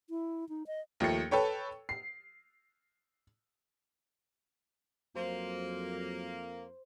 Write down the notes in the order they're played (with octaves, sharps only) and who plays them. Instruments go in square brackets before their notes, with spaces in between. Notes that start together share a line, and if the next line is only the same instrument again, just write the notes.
[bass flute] E4
D#4
D#5
[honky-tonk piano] D#2 F3 A3 C#7
A4 B4 C#5 G5
C7
[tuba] F2 [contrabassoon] F#3 [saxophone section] A#3 [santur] C5